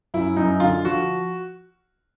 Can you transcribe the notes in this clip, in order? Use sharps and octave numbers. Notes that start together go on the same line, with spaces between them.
F#2 E4
F#2 D#4
D3 F4
F3 F#4